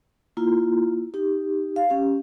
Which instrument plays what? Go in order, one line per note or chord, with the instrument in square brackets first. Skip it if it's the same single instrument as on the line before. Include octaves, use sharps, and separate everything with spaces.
[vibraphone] A#3 E4 F4
D#4 G4
F5
C#4 G4